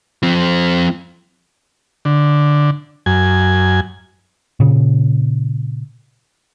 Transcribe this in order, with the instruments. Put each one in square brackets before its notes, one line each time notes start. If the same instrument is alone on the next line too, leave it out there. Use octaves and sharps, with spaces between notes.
[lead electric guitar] F3 C4
[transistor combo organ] D3
F#2 G#5
[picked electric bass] A#2 C#3